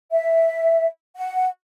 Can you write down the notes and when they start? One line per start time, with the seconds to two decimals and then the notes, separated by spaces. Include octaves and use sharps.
0.12 E5
1.17 F#5